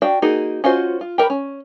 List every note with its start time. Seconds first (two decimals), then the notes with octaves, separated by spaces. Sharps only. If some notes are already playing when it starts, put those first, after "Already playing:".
0.02 D4 F#4 F5 G5
0.22 A#3 D#4 F#4 G#4
0.64 C#4 F4 F#4 C5 D#5
1.01 F4
1.18 G4 A#4 A#5 B5
1.30 C#4